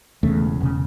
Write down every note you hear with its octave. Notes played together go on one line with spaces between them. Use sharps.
E1 E2 C#3 A3
E1 C#3